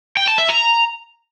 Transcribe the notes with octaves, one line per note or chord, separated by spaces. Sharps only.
G5
A5
E5
A#5